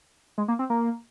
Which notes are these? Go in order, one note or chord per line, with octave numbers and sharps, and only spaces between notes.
G#3
A#3
C4
A#3